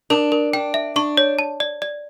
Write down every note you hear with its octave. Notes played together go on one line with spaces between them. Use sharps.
D4 A#4
A#4
D4 G5
E5
D4 C#6
C#5
A5
D5
D5